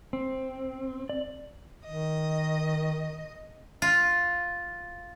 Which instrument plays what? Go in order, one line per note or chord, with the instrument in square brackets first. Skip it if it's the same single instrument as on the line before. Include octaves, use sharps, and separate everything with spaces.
[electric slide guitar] C4
D5
[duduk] D#3 [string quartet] D#5
[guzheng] F4